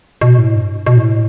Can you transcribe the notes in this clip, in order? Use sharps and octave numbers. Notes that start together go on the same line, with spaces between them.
B2
A2
G2
B2
A2